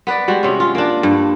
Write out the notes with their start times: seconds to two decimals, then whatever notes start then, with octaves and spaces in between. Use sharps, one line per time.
0.07 B3 B4 D5
0.28 G3 G#3 F#4
0.43 C3 C#4
0.60 F4
0.75 A#3 D4
1.03 G2